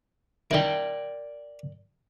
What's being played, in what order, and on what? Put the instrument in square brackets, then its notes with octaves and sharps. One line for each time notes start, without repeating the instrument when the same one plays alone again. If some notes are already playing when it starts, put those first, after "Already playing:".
[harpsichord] D#3 E4 [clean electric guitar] A#4 D5 G5